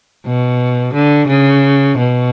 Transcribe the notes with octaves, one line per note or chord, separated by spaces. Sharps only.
B2
D3
C#3
B2